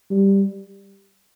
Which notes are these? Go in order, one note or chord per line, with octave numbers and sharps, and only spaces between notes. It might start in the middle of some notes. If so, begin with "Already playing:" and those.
G3